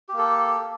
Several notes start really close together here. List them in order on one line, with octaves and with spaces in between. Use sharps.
G4 A#3 A4